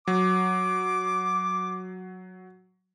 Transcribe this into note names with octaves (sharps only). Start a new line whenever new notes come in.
F#3 D6